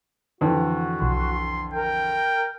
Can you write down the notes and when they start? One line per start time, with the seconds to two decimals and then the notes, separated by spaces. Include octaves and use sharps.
0.41 F2 D3 E3 F#4
1.02 B1 C6
1.74 A#4 G5